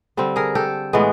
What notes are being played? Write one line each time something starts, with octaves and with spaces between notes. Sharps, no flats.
D3 G3 C4
G#4 A#4
G4 A4
A2 E3 G#3 B3